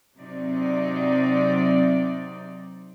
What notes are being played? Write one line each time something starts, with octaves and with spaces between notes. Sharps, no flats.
C3 F#3 C4 D#4 D5